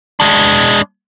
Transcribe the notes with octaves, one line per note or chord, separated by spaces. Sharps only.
G#3 D4